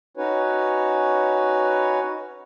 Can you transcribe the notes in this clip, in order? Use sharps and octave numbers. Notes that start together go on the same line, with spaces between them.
C#4 D#4 F#4 B4 C#5